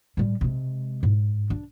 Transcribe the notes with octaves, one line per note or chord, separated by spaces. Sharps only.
A2 G3
C3 G#3
G#2
D4